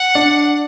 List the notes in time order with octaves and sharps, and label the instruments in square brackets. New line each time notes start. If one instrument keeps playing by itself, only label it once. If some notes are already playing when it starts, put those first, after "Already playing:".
Already playing: [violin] F#5
[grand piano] D4